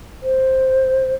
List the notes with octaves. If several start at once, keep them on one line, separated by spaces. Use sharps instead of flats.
C5